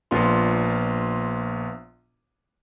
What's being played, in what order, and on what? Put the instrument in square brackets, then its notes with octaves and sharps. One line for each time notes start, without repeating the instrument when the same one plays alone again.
[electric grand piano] A#1 B3 D4 F4 C6